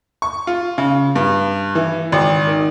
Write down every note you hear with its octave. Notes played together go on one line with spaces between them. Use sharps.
C#6
F4
C#3
G2
E3
G#1
D#3